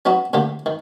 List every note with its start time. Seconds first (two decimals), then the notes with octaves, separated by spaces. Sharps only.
0.05 F#3 B3 C#4 D#4 F#4
0.33 A2 D3 A#3 G4
0.66 D#3